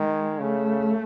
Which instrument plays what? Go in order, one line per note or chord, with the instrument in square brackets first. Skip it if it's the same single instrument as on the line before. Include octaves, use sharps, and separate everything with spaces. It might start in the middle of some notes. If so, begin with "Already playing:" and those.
Already playing: [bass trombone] D#3 [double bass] G#3
[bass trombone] C#3 [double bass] A3